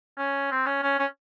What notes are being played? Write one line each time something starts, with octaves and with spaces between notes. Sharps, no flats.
C#4
C4
C#4
C#4
C#4